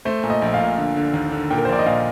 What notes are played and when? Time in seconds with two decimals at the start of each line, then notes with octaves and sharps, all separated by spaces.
0.05 A3 C5
0.23 A#2
0.30 D#5
0.42 A#1
0.54 F5
0.60 A#2
0.77 D3
0.96 D3
1.14 D#2
1.32 D3
1.50 A#2 G5
1.58 A#4
1.65 C5
1.69 A#1 D5
1.79 D#5
1.86 A#2 F5